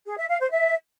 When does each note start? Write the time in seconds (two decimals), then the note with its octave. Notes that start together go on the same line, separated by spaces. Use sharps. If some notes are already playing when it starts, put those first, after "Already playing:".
0.06 G#4
0.17 E5
0.28 F5
0.40 C5
0.51 E5